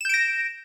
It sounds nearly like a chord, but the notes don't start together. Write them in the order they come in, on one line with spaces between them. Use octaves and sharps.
E7 G6 D7 A#6